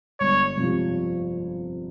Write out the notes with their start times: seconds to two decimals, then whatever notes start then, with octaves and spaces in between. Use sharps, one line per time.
0.20 G1 C#5
0.57 F2 C3 F3